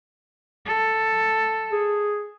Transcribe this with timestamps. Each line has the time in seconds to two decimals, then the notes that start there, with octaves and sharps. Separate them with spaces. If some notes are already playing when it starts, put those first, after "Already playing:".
0.66 A4
1.72 G#4